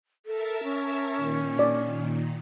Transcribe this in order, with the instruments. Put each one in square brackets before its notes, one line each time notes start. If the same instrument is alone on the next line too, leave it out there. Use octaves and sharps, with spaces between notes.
[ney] A4 [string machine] A#4 E5 A5
[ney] C#4
[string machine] A#2 D#3
[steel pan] D5